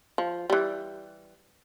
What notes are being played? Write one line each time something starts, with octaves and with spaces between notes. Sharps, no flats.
F3
E3 G3